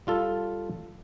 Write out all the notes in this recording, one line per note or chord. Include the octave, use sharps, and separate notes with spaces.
G3 F4 A4